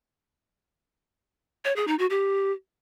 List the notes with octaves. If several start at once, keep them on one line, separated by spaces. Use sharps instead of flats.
C#5
G#4
D#4
F#4
G4